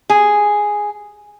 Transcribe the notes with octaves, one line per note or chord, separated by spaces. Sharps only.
G#4